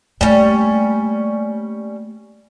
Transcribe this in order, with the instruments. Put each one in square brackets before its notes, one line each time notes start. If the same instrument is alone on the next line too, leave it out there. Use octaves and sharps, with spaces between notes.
[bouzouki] G3 C#4 [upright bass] A3 A#3